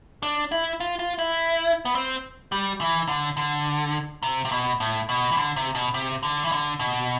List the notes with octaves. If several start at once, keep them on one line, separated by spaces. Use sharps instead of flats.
D4
E4
F4
F4
E4
B3
C4
G3
E3
D3
D3
C3
C3
B2
A2
B2
E3
D3
C3
B2
C3
D3
E3
D3
B2